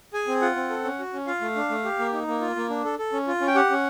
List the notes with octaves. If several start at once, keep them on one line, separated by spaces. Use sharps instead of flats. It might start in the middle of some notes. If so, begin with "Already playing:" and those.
G#4 G#5
C4
F4 F#5
C4
A4
C#4
F#4
C#4
F4 F5
A3
D4
A3
G4
A#3
D#4
A#3
F4
A#3
D4
A4
A4
C#4
F4
C#4
G5
G4 F#5
C#4